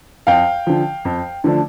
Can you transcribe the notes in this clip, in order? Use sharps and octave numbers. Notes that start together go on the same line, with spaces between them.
F2 F5 G5
D3 F3
F2
D3 F3 A3 D4